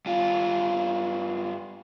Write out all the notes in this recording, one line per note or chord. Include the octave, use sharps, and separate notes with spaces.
G2 F4